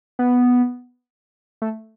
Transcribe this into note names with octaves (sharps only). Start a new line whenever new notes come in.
B3
A3